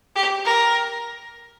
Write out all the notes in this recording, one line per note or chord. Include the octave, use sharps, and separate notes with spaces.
G4
A#4